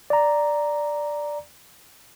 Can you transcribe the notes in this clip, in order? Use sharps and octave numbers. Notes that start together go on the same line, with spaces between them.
D5 A#5